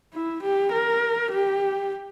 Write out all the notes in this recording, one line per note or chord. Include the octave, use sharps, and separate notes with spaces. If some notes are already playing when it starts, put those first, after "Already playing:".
E4
G4
A#4
G4